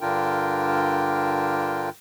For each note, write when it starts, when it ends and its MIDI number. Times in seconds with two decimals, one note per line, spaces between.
0.01 1.90 43
0.01 1.90 50
0.01 1.90 62
0.01 1.90 65
0.01 1.90 70
0.01 1.90 79